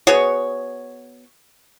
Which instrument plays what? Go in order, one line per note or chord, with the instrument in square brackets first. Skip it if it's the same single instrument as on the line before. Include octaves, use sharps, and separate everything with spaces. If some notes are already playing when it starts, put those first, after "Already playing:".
[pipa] B3 F#4 G#4 C#5